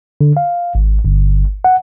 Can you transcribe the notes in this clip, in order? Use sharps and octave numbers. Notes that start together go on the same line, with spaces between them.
D3
F5
G#1
G1
F#5